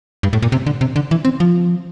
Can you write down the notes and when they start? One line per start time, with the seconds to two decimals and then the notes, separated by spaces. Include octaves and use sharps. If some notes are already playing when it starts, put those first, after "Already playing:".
0.23 G2
0.33 A2
0.42 A#2
0.52 C3
0.67 D3
0.81 C3
0.96 D3
1.11 E3
1.25 C4
1.40 F3